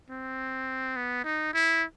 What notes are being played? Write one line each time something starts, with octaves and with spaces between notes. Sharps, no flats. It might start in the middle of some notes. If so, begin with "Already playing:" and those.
C4
B3
D#4
E4